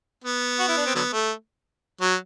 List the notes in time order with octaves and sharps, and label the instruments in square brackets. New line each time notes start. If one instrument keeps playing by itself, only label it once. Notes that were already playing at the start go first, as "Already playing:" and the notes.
[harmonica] B3
F#4
E4
D4
C4
D3 F#3 B3
A3
F#3